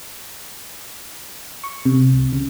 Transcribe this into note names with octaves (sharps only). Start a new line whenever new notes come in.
C#6
C3
C2
C#3